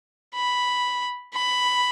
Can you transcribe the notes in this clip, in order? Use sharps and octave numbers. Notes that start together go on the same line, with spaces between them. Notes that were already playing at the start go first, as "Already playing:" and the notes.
B5
B5